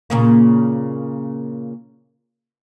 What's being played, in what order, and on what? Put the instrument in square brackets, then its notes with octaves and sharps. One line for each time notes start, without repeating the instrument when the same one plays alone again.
[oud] A#2 C#3 A#3